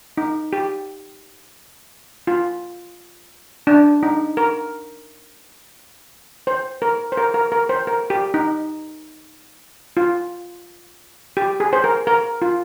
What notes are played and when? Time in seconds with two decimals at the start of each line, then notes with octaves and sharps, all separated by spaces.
0.17 D#4
0.53 G4
2.27 F4
3.67 D4
4.03 D#4
4.37 A#4
6.47 C5
6.82 A#4
7.12 C5
7.17 A#4
7.34 A#4
7.52 A#4
7.69 C5
7.87 A#4
8.10 G4
8.34 D#4
9.97 F4
11.37 G4
11.60 G#4
11.73 C5
11.84 A#4
12.07 A#4
12.42 F4